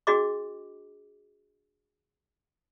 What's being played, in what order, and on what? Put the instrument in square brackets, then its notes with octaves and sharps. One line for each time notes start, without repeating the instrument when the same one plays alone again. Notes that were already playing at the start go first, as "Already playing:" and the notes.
[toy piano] D4 F#4 G#4 D#5 D6